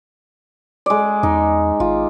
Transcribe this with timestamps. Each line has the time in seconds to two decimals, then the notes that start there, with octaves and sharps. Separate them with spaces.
0.86 G#3 D5
1.23 E2 D#4
1.80 G#1 F4